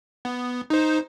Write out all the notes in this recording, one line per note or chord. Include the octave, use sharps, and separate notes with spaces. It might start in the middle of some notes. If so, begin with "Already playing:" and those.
B3
D#4 C5